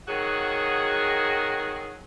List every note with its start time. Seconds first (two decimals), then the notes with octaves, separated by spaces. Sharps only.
0.08 D#3 F#3 F#4 G#4